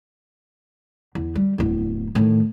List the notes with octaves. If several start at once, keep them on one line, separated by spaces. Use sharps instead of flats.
E2
G3
D1 E2
A2 D#3